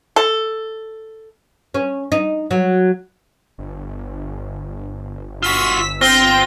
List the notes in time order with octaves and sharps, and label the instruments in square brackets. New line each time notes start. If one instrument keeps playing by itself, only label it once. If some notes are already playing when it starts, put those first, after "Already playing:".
[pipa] A4
[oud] C#4
D#4
F#3
[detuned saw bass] G1
[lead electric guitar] F4 F#4 [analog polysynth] E6 B6
[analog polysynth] C4 G5 [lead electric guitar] F4 [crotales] A#6 G7